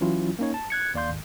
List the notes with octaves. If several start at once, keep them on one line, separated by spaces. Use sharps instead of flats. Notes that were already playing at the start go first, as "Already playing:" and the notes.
E3 F#3 C#4 E4 F4
A#3 C#4 D#4 C#5
A5
F#6 G#6 C#7
D#2 D5 F5 C6 G6
G#1